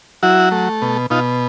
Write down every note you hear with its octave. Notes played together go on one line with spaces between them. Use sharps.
F#3 E4 F#4
A3
B2
B2 D#4 F4